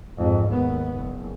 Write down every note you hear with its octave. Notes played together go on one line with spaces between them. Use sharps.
F2 G#2
D#2 B3
F#1